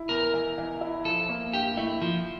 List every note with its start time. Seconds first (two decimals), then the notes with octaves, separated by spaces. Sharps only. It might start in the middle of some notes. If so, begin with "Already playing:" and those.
Already playing: E4
0.09 E2 A#4
0.34 E3
0.58 E3
0.81 E4
1.05 F3 A4
1.29 A#3
1.53 G2 G4
1.77 A3 E4
2.01 F3 F4